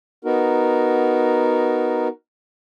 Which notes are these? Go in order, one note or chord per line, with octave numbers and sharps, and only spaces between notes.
B3 D#4 F#4 A#4